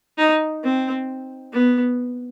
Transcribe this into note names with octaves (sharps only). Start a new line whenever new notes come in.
D#4
C4
B3